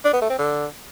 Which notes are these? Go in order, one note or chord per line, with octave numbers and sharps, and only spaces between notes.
D4
B3
A3
C4
D3